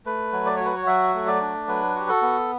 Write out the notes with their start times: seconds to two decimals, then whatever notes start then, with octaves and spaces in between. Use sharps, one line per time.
0.06 A3 B4
0.32 F#3
0.46 D5
0.57 F#4 C#5
0.65 B4
0.76 C#5
0.87 F#3 E5
1.14 A3
1.27 D5
1.41 D4
1.68 F#3 B4
1.95 F#4 G4
2.09 A4
2.22 B3